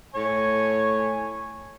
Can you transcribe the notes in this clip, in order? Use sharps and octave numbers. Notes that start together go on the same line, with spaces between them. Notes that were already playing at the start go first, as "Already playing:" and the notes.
A2 C#5 G#5